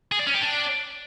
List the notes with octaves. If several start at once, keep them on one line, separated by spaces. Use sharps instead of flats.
G#4
D5
C#4
G4
D4